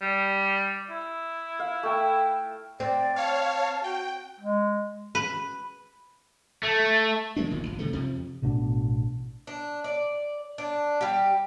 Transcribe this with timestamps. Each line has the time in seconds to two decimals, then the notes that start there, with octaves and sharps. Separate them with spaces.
0.01 G3
0.90 E4
1.59 F5
1.83 A3 G5
2.80 C4 D5
3.16 C#5 F5 A5
3.84 F#4 G5
4.40 G#3
5.15 B4
6.63 A3
7.36 F3 G#3 A#3 D4
7.51 E1 A#2 D#3
7.66 G1
7.79 C3 D#3 A3
7.93 F2 C3 F3
8.42 A1 B2 B3 D4
9.47 D4
9.84 D5
10.58 D4
11.01 G3 G4